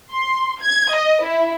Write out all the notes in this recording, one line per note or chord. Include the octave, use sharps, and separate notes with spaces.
C6
G#6
D#5
E4